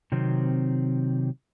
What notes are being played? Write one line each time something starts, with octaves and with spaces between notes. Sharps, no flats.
C3 D#3 F#3 C4